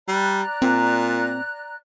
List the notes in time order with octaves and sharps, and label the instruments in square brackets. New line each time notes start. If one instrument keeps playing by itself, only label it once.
[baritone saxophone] G3 [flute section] D5 A#5 F#6
[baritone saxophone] A#2 [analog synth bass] C4